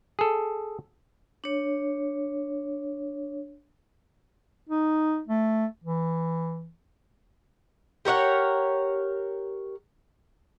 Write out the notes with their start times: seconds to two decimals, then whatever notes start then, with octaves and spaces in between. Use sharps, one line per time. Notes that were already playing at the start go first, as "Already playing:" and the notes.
0.19 G#4 A4
1.44 D4 C#5
4.69 D#4
5.28 A3
5.84 E3
8.05 G4 A#4 C#5 F#5